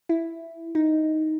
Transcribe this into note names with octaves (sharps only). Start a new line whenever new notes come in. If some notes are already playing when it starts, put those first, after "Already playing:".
E4
D#4